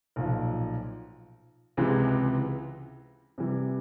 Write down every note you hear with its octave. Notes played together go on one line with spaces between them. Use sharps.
B1 A#2 F3
C#2 C3 E3 G#3
C3 E3 G3